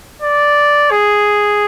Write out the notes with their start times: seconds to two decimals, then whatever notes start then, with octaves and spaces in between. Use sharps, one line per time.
0.22 D5
0.91 G#4